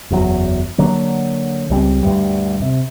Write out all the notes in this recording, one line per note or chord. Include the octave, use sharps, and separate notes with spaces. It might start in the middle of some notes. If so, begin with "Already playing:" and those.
F#1 E2 A#2 F#3
D3 F#3 A#3
C#2 G3 A3 C4
D2 G2 G3
C3